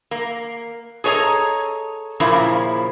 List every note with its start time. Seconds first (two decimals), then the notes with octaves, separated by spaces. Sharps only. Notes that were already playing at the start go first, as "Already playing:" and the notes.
0.11 A#3
1.04 G#4 A4 C#5 D#5 A#5
2.20 A#2 C#3 F3 A#3 E4